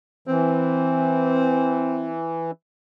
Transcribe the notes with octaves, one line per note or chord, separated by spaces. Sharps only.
E3 C4